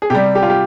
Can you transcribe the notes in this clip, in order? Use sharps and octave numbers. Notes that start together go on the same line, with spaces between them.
G#4
C3 G3 G4
G4
F4
G4